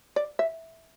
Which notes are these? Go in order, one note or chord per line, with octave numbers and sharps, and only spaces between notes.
D5
E5